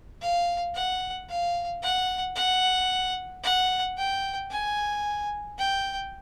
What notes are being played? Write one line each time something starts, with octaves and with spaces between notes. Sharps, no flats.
F5
F#5
F5
F#5
F#5
F#5
G5
G#5
G5